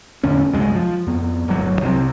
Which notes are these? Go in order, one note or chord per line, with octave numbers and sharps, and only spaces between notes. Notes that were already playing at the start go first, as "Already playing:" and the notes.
E2 A2 D3 C#4
C2 F#2 G#3
F3
F2 B3
D1 G1 F#3
C2 C3